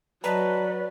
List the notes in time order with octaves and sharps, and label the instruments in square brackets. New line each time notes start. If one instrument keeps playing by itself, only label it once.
[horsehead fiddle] F#3 [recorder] B4 [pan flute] D5 [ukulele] D#5 A5 A#5